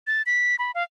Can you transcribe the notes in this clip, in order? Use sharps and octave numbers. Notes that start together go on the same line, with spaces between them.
A6
B6
B5
F5